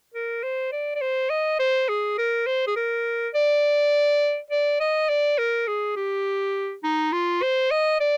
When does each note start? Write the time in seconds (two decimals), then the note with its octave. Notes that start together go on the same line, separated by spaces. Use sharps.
0.14 A#4
0.43 C5
0.72 D5
0.95 D5
1.01 C5
1.30 D#5
1.59 C5
1.89 G#4
2.18 A#4
2.47 C5
2.67 G#4
2.76 A#4
3.34 D5
4.50 D5
4.80 D#5
5.09 D5
5.38 A#4
5.67 G#4
5.96 G4
6.84 D#4
7.13 F4
7.42 C5
7.71 D#5
8.00 D5